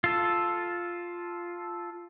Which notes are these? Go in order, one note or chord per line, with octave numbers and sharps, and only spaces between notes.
F4 A4